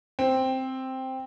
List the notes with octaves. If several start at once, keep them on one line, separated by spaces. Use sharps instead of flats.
C4